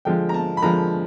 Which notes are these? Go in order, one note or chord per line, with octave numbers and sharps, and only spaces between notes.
D3 F3 G#3 G5
A#5
A5
B5
D3 F3 G#3 A#5